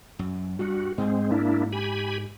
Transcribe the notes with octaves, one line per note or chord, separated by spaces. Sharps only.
F#2
G2 G3 F#4
G#2 G#3 C4
A#3 D4 E4
G4 G#5 B5